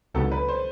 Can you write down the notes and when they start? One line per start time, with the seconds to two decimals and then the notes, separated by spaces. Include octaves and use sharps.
0.14 C#2 C3 D#3 F#3 B3 A4
0.32 B4
0.49 C5